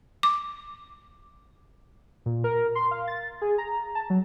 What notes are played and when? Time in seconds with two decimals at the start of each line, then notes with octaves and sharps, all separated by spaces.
0.23 D6
2.26 A#2
2.44 A#4
2.75 C6
2.91 F5
3.08 A6
3.42 G#4
3.58 A#5
3.95 A5
4.10 F#3